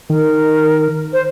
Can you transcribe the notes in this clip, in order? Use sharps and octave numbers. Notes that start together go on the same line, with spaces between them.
D#3 A#4
C5